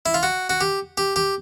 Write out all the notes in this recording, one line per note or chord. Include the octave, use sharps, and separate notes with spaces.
E4
F4
F#4
F#4
G4
G4
G4